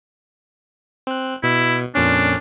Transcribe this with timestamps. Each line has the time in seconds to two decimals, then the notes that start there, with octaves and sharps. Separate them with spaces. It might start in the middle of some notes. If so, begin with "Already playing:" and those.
1.07 C4 F#6
1.43 B2 E4
1.95 F2 A#2 C#4 D4